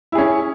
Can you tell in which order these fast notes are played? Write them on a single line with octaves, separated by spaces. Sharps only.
E4 G#4 C#4